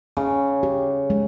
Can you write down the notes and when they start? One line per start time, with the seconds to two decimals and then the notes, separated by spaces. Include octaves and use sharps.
0.17 C#3 C#4
0.63 G4
1.10 G#3